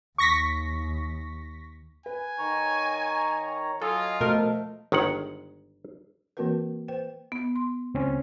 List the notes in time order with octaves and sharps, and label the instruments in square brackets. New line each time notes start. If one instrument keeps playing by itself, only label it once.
[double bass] D#2 [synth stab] C#6 A#6 B6
[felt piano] B4 [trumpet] G#5
[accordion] D#3 C#5 A#5
[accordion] F#3 D#5 G#5 [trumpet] F4 [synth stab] A4
[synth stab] B2 A#4 [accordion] F3 [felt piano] A3 D#5
[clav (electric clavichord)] G1 D#3 G#3 F#5
[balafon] E3 A#3 C4 F#4 A#4 B4
B4 C5 G5
[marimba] B3
C6
[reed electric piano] C#2 C4 C#4